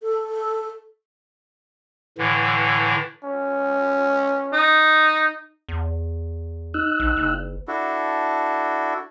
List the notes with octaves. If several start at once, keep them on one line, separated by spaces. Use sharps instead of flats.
A4
A2 D3 E3
C#4
D#4
E2
D#4 E6 F#6
A#1
F#1
D4 E4 F#4 A4